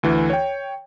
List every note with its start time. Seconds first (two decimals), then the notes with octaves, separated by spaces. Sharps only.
0.03 D2 E3
0.30 C#5 G5